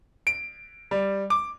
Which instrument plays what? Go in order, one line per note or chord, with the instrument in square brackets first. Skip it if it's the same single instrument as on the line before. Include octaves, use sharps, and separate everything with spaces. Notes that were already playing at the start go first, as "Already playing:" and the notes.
[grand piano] D7
G3
D6